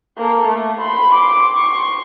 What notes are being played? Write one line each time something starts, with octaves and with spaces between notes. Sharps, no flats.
A#3 A4
A3
B5 C6
C6 D6
C6 C#6